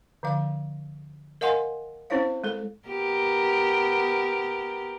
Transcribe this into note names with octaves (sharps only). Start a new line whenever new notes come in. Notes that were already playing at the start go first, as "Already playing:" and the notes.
D3 F3 F5
A#4 D#5 F5 F#5 G#5 C6
C4 C#4 E4 C5 C#5 F5
G#3 A4
B3 G4 A#4